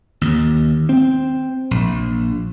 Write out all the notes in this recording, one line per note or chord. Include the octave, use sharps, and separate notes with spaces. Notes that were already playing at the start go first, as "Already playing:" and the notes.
D#2
C4
A#1